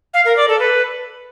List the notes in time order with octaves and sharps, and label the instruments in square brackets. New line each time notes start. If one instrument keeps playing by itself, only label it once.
[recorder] F5
A#4
D5
A4
B4